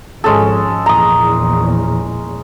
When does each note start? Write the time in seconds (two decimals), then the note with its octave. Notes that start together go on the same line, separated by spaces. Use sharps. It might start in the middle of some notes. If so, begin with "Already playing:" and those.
0.24 G#1 F3 G#3 C#4 A4
0.86 A#1 E2 A#2 A#5 D#6